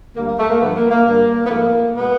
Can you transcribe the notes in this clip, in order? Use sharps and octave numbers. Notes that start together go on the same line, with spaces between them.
D2 D3 G3 A#3
A#3
A3
A#3
G2 D3 F3 B3
A#3
A#3
G2 D3 G3 A#3
B3
G#2 F3 A3 A#3
B2 G#3 B3